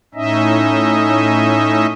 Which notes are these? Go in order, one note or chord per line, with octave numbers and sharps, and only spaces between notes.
A2 C#4 D#4 D#5 E5